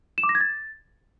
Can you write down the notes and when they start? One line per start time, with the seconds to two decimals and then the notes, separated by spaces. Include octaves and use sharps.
0.18 E7
0.23 D6
0.29 A#6
0.35 G#6
0.41 A6